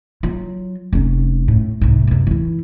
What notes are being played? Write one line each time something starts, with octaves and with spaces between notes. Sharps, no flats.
F#3 F4
F1 C#4
A2
C2 G#2
F#2 C3
E3 E4